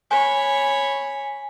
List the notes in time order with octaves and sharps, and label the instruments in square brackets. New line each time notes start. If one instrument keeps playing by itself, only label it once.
[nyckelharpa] C#5 B5 [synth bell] G#5